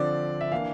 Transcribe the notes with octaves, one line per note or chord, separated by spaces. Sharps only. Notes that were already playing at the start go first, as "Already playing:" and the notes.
Already playing: D3 F3 C4 D5
E5
E3 A#3 D4 F5